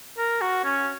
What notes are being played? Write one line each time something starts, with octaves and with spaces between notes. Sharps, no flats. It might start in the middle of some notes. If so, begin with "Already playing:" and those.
A#4
F#4
C#4